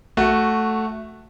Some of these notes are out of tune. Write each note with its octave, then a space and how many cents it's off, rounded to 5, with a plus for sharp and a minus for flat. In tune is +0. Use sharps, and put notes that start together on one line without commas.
A3 +0 F#4 +0